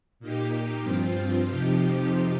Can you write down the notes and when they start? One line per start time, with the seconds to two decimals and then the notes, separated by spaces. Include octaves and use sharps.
0.20 A#2 A#3 D#4 G4
0.83 G2 F3 C4 F4
1.46 F2 C3 F3 D#4 G4